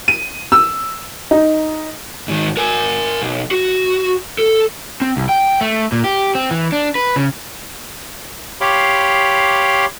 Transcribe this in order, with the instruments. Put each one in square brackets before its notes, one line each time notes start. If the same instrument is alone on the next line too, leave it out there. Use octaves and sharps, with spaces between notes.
[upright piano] D#7
E6
D#4
[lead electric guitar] G#2 D#3
A#4 G#5
B1
F#4
A4
[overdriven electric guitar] C4
C2
G5
A3
A#2
G4
C4
E3
D4
B4
C#3
[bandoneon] G4 C#5 F5 B5 C6 D6